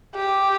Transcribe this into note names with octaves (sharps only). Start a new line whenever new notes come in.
G4